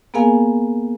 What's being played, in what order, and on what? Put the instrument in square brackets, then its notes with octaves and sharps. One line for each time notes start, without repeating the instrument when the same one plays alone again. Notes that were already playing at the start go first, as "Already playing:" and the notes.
[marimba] A#3 B3 G#4 A#4 F5 G#5